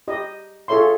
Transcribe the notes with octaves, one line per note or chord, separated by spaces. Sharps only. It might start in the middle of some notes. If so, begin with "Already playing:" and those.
G4 D#5
F4 G#4 A4 C#5 E5 C6